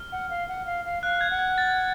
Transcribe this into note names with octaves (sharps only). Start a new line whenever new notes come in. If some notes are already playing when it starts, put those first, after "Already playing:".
Already playing: F6
F#5
F5
F#5
F5
F5
F5 F#6
G#6
F#5
G#6
A6